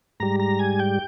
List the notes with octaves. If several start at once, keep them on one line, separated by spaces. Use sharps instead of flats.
G#2 G3 A#5
A#5
G#5
G5